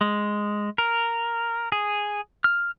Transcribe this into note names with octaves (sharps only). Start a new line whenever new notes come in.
G#3
A#4
G#4
F6